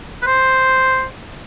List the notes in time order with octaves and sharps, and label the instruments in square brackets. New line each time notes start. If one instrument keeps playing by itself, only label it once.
[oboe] B4
C5